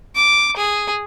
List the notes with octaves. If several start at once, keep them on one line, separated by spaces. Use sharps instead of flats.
D6
G#4